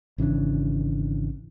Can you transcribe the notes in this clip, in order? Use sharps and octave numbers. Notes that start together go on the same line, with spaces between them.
G#1 C#3 E3 D4